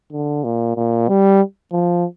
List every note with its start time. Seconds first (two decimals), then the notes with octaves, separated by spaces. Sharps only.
0.12 D3
0.44 A#2
0.76 A#2
1.08 G3
1.71 F3